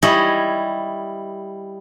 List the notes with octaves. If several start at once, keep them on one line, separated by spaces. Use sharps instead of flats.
G3 E4 C#5 D#5 G#5